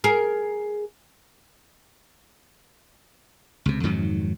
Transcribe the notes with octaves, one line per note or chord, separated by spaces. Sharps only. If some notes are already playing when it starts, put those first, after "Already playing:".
G#4 A#4
C#2 C3
F2 G#2 D#3 F#3